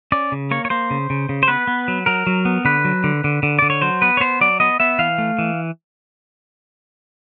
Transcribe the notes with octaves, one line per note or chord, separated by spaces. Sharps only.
C#4 D5
C#3
A#3 C#5
C#5
A#3 C5
C#3
C#3
C#3
C5
B3 B4
B3
F#3
F#3 A#4
F#3
B3
D3 B4
F#3
D3
D3
D3
D3 D5
C#5
F#3 C5
B3 B4
C#5
B3 C5
F#3 D5
B3 D#5
B3 E5
E3 F5
A3
E3